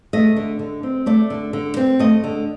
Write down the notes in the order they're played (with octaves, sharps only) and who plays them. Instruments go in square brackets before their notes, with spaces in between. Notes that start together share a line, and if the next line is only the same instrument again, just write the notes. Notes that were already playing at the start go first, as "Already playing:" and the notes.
[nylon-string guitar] A3 D#5
D3
D3
C4
A3 D5
D3
D3
C4
A3 D#5
D3